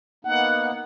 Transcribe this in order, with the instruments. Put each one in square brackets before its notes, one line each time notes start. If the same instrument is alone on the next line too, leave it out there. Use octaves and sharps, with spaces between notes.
[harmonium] A#3 B3 D#4 [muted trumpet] F#5